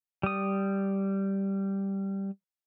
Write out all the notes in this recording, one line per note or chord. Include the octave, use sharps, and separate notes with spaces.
G3 D#6